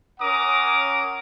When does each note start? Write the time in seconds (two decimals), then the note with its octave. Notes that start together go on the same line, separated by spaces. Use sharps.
0.20 C#4 A#4 F#5 A#5 D6 D#6